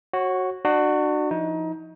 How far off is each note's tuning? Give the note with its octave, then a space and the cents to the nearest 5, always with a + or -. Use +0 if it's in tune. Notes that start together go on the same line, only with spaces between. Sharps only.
F#4 +0 C#5 -30
D4 +35 F#4 +0
F3 -10 D#4 +30